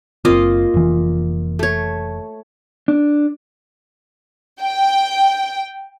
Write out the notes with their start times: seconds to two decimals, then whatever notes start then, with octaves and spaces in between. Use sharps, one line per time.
0.25 F#1 A#3 C4 F4 D#5
0.74 F1 E3
1.59 A3 C#5
2.88 D4
4.61 G5